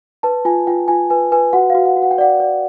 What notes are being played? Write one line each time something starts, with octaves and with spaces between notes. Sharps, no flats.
B4 A5
F4 G#5
F4 G5
F4 G#5
B4 G#5
B4 G#5
F#4 F#5
F5
F#4
F#5
F#4
F#5
G5
D5 F#5
D5